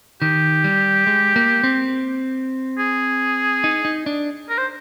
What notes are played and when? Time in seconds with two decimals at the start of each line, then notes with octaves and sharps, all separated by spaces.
0.22 D#3 G4
0.64 G3
1.07 G#3
1.36 A#3
1.64 C4
2.78 G#4
3.64 D#4
3.85 D#4
4.06 D4
4.49 A#4
4.58 C5